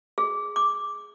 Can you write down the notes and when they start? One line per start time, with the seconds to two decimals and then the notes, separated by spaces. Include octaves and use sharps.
0.18 G#4
0.56 D6